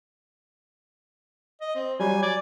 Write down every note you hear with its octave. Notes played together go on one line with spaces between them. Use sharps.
D#5
C4
F#3 G3 G#5
D5 G#6